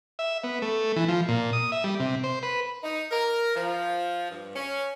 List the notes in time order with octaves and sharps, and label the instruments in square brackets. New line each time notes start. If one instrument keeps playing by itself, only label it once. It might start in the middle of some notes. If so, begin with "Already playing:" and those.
[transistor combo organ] E5
B3
A3
E3
F3
A#2
D#6
E5
G3
C3
C5
B4
[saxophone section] D#4
A#4
F3
G2
C#4